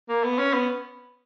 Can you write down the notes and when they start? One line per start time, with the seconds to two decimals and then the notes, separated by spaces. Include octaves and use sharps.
0.09 A#3
0.24 B3
0.39 C#4
0.54 B3